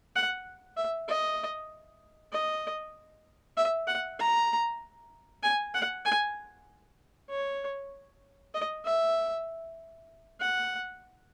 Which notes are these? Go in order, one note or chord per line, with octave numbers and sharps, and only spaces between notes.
F#5
E5
D#5
D#5
E5
F#5
A#5
G#5
F#5
G#5
C#5
D#5
E5
F#5